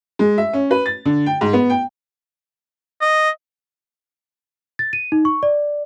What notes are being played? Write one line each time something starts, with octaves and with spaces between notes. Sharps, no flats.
G#3
E5
C#4
B4
A6
D3
G5
G#2
B3
G5
D#5
A6
D#7
D#4
C#6
D5